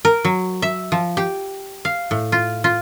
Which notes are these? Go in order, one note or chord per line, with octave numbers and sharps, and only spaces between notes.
A#4
F#3
E5
F3
G4
F5
A2
F4
F4